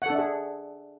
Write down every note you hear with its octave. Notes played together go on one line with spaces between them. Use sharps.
D4 G#4 A4 E5 F#5